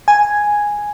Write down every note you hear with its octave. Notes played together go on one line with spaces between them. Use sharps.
G#5